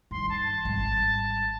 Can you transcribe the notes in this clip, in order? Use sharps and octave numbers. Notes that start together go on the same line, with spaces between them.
G2 D#3 C6
A5
G#1 G3